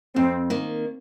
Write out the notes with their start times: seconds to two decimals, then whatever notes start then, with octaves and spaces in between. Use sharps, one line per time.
0.16 F2 C4
0.50 D#3 A#3